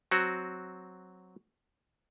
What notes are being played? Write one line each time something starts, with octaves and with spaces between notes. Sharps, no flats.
F#3 C4 F#4